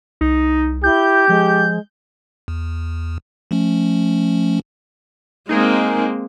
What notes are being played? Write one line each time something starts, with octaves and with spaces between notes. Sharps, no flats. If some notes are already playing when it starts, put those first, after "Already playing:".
C2 D#4
E4 G4 G6
F3 G#3
E2
F3 A3 C#4
G#3 A#3 C4 D#4 G#4 A#4